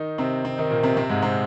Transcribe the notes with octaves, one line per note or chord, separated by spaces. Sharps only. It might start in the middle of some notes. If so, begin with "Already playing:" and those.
Already playing: D#3 D#4
C3 C4
C3 C4
D#3 D#4
A#2 A#3
C3 C4
C3 C4
G#2 G#3
C3 C4